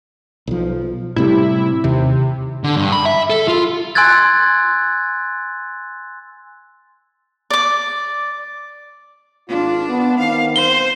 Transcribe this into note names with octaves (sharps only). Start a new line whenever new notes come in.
B1 F3
A2 C3 G3 E4
D#2 C3
D3
G2
B5
E5
A4
F4
G#5 C6 E6 F#6 G#6 A6
D5 D6
G#1 D4 F4
B3
D#3 B3 C4 F5
C5 G7